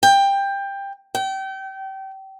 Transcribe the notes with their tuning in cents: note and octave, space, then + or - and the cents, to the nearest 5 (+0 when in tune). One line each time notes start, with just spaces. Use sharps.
G5 +15
G5 -30